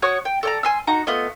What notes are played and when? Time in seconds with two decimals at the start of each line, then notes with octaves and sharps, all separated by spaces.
0.02 F#4 C#5 C#6 D#6
0.25 G5
0.43 A4 D5 A#5
0.63 G#5 C6 E6
0.87 D#4 F#4 A#5
1.07 A3 B3 F4 D#5